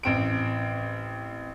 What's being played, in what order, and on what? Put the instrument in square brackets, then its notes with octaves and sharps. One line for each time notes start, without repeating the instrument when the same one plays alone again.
[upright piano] A1 C4 D7